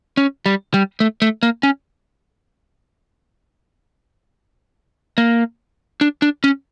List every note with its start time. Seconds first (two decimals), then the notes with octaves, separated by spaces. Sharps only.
0.17 C#4
0.46 G3
0.74 G3
1.00 A3
1.22 A3
1.43 A#3
1.63 C#4
5.18 A#3
6.01 D4
6.22 D4
6.44 C#4